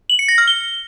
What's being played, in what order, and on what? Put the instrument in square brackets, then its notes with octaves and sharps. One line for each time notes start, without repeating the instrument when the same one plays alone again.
[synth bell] F#7
C#7
A#6
F6
G7